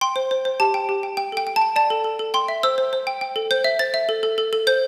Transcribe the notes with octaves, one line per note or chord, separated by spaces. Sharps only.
G5 C6
C5
C5
C5
G4 A5
G5
G4
G5
G5
A4 G5
G5
A5
G5
D5 A5
A4
A4
A4
G5 C6
E5
C5 E6
C5
C5
G5
G5
A4
C5 G6
E5
C5 A6
E5
A4
A4
A4
A4
C5 G6